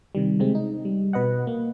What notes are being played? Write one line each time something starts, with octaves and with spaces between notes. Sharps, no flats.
C3 D#3 G3
C3 G#3 C4
D#4
G3
B2 B4 D#5 F#5
A#3